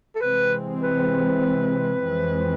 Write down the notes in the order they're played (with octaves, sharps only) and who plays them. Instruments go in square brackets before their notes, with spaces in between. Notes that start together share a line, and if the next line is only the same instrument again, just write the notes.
[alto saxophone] A4
[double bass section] C3 E3 G#3 C4 [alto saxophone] B4
[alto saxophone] B4
[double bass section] F2 E3 G#3 C4